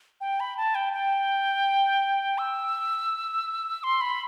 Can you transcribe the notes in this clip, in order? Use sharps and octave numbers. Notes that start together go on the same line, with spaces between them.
G5
B5
A5
G5
G5
E6
C6
B5